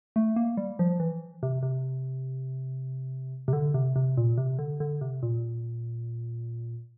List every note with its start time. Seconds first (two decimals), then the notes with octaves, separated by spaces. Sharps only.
0.16 A3
0.36 A#3
0.57 G3
0.79 F3
1.00 E3
1.43 C3
1.63 C3
3.48 C3
3.53 D3
3.74 C3
3.96 C3
4.17 A#2
4.37 C3
4.59 D3
4.80 D3
5.01 C3
5.23 A#2